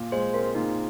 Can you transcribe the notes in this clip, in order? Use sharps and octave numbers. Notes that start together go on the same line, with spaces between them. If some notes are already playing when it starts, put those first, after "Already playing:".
Already playing: A#2
G#3 C5
C4 A#4
A#2 D#4